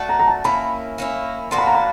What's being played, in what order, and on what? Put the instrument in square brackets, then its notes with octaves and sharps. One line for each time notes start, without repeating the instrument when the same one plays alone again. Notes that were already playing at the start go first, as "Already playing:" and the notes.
Already playing: [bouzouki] A3 D4 F#4
[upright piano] A#5
A#5
A5
[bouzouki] A#3 C#4 E4 [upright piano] B5
[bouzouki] A#3 C#4 E4
[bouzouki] F3 A#3 D4 F#4 [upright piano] C6
[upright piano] B5
A#5
B5